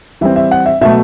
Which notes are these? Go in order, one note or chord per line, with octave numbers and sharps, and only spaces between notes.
E3 G3 C4 E5
E5
F#5
E5
B2 F#3 A3 E5